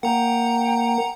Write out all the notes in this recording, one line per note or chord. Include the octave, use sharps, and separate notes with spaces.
A#3 F#5 G5 A#5